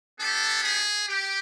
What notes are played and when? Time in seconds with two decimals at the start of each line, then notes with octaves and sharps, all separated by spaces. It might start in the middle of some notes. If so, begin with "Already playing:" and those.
0.19 B3 D4 G4 A4
0.64 G#4
1.08 G4